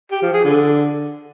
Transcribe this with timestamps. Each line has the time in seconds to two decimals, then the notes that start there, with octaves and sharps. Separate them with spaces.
0.11 G4
0.22 F3
0.33 G#4
0.44 D3